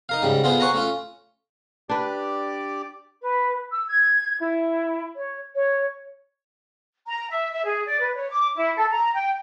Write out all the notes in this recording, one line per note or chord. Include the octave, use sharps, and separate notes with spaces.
D#4 A#4 F5
G#2 C#3 G3
D3 B3 F4 G#4 C5
C5 C#5 F#5 G#5 A#5
A3 C#4 F4
D4 G4 B4 D5 D6
B4
E6
G#6
E4
C#5
C#5
A#5
E5
E5
G#4
D5
B4
C#5
D6
E4
A4
A#5
G5